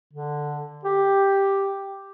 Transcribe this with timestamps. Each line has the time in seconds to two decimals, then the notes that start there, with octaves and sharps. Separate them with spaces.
0.14 D3
0.85 G4